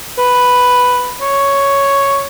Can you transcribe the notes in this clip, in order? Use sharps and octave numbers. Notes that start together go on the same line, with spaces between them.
B4
C#5